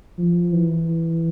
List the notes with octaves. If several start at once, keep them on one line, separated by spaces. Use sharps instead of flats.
F3
E3